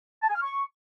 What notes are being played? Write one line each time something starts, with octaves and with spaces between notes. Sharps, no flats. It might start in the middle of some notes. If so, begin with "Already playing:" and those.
A5
G#5
F6
C#6